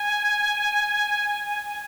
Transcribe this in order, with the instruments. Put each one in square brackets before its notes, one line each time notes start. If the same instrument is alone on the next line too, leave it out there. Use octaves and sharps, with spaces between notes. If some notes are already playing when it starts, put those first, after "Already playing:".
Already playing: [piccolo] G#5